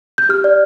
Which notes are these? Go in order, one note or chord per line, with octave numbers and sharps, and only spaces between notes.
G6
G4 F6
D5